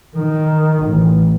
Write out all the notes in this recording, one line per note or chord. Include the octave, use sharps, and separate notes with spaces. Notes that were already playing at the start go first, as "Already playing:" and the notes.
D#3
A1